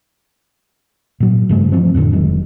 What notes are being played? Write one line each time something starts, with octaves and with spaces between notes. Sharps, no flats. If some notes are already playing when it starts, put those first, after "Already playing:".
A#2 F#3
G2 C#3 G3 A3
E3 F3 A3 C4
F2 A2 D3
F1 D#3 F#3 G#3